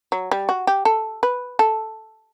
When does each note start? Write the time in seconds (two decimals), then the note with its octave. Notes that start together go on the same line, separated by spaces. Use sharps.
0.12 F#3
0.31 G3
0.49 F#4
0.67 G4
0.85 A4
1.23 B4
1.59 A4